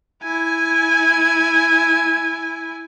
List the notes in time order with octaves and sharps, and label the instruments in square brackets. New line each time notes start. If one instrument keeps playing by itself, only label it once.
[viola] E4 G#5